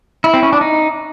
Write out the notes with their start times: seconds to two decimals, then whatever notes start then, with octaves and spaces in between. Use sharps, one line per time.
0.24 E4
0.34 C4
0.43 C#4
0.53 D4
0.61 D#4